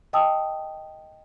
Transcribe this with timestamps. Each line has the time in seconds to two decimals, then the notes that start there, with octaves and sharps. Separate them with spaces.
0.13 D#5 G5 A5 D#6 E6